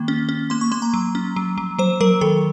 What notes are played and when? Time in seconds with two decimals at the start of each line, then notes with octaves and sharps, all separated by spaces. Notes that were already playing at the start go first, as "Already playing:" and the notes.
Already playing: D#3 A#3
0.08 C#4
0.29 C#4
0.50 A#3 C6
0.61 C#6
0.71 A#3 C6
0.82 A#5
0.94 F#3
1.15 C#4
1.36 F#3
1.58 F#3
1.79 F#3 C5
2.01 F#3 A#4
2.21 D#3 A4